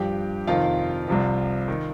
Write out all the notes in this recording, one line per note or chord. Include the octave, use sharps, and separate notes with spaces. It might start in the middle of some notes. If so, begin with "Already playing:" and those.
Already playing: G2 F3 G4 G5
F2 C3 D#3 F4 F5
C2 C3 F3
D#3